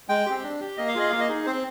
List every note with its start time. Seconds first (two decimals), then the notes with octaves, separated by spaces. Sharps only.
0.09 G#3 G5
0.26 C4 G4
0.43 D4
0.61 G4
0.77 A#3 D#5
0.88 F5
0.95 F4 G#4 D#5
1.10 A#3 F5
1.20 D#5
1.29 D#4 G#4
1.46 C4 C5